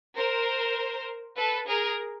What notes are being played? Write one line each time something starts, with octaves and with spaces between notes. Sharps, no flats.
A#4 C5
A4 B4
G#4 A#4